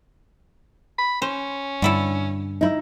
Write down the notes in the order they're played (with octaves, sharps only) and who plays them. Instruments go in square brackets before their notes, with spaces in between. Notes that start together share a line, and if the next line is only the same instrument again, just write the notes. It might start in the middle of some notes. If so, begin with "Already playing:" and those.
[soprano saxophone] B5
[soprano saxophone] C#4 [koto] C5
[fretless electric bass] G2 [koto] D3 E4 A4
[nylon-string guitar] D#4 E4